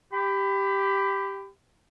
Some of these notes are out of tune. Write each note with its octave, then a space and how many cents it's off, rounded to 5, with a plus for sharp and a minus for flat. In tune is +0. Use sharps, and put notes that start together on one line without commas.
G4 +0 B5 +25